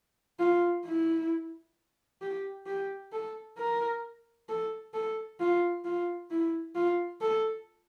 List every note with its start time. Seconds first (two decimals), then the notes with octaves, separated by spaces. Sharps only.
0.39 F4
0.85 E4
2.21 G4
2.66 G4
3.12 A4
3.58 A#4
4.49 A4
4.94 A4
5.40 F4
5.85 F4
6.30 E4
6.75 F4
7.21 A4